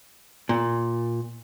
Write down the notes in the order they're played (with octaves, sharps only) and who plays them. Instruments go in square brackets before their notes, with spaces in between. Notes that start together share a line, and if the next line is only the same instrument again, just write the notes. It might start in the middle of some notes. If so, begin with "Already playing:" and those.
[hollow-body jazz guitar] A#2